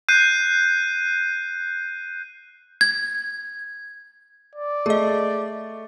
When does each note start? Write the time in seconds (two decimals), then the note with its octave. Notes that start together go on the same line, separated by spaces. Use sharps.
0.09 F#6 G6 C7 D#7
2.81 G#6
4.56 D5
4.86 A3 G#4 D#5